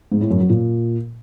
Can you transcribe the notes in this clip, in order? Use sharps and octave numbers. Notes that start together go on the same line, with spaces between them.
G#2
A2
F#2
F#3
A#2